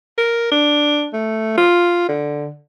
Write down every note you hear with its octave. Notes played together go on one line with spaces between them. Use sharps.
A#4
D4
A3
F4
D3